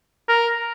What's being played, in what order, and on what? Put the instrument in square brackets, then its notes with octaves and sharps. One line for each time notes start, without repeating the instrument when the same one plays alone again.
[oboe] A#4